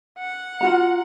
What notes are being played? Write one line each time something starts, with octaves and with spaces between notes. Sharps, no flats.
F#5
F4 F#4 A#5